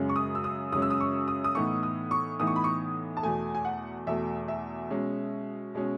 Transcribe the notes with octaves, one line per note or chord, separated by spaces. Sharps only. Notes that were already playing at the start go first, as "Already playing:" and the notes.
Already playing: F#2 C#3 G#3 C#4
C#6
D#6
E6
D#6
F#2 C#3 G#3 C#4 D#6
E6
D#6
C#6
D#6
D#6
A2 E3 B3 D#4 C#6
D#6
C#6
A2 E3 B3 D#4 D#6
C#6
B5
C#6
A5
E2 B2 A3 G#5
G#5
F#5
E2 B2 A3 E5
E5
B2 G#3 C#4
B2 G#3 C#4